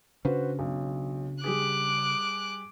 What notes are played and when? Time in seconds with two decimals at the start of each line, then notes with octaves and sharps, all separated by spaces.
0.25 C#3 C#4 D4 F#4 B4 C5
0.59 B1
1.44 G3 G4 G#4 D6 F#6